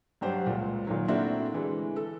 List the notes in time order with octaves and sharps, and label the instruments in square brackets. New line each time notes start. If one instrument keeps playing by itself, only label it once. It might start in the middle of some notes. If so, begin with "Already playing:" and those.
[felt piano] G2 F#3 G4 C5 F#5 A5
C#2 A#2
A#2 D#3 F#3
A3 A#3 C4 D4 E4 F#4
D3 E3 G#3
A4